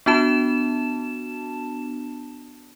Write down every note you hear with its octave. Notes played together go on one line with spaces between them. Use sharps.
B3 D4 F#4 A5 E7